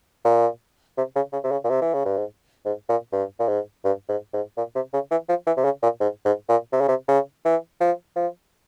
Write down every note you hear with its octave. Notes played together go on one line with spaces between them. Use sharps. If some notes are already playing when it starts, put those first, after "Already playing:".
A#2
C3
C#3
C#3
C3
C#3
A#2
C3
E3
C#3
G2
G#2
G#2
A#2
G2
A#2
G#2
G2
G#2
G#2
A#2
C3
C#3
E3
F3
E3
C3
C#3
A#2
G#2
G#2
A#2
C3
C#3
C3
C#3
E3
F3
F3